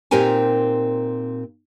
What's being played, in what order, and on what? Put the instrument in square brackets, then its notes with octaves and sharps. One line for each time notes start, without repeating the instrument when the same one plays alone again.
[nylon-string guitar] A#2 C4 D#4 G4 A#4 G#5